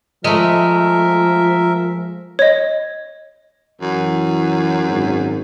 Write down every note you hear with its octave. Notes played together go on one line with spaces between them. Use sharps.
F3 G#3 A3 A#4 E5
C#5 D#5
F#2 E3
G#1